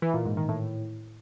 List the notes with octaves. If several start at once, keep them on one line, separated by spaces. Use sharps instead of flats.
E3
A#2
G#2
D#3
A2